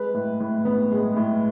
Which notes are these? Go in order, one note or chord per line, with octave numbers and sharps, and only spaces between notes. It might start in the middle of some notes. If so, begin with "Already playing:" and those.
Already playing: G#3 B4
A2
A2
B3
G#3
A2